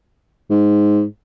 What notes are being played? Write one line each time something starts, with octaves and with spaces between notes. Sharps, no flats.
G#2